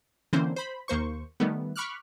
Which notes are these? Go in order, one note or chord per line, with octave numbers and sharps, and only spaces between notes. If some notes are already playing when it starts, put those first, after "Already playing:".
D3 E3 A#3 C4 C#4 C5
C5 B5
D#2 A#3 C5 C#6
D#3 G3 A3 B3
B5 C#6 D6 F6 F#6